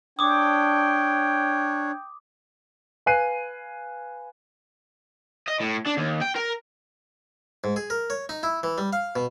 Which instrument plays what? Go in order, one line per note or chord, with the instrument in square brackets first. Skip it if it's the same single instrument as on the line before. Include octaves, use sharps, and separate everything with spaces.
[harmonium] D4 C#5 [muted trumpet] G5 [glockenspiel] D6 D#6
[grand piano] B4 F5 G#5 F#6 C7 D#7
[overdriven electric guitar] D#5
A2
D4
D#2
G5
A#4
[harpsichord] G#2
G#4
A#4
C#5
D#4
E4
E3
G3
F5
B2